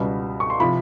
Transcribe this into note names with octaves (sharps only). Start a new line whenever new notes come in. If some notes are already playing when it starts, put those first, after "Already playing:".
Already playing: C#2 B2 G3 B3
C#6
C6
C3 F3 B5